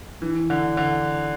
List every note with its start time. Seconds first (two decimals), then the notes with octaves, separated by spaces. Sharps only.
0.22 E3
0.50 D3
0.77 D3